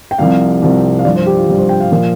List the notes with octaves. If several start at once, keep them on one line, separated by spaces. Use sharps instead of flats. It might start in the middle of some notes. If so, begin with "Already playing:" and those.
G5
C2 C3 F3 F5
C2 C3 F3
F5
G2 F3 D5
C5
G4
F4
G2 F3 G4
C5
G5
F5
A#2 F3